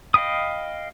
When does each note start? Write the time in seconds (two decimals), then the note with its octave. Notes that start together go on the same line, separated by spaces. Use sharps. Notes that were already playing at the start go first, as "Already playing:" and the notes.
0.14 D#5 F5 G5 B5 D#6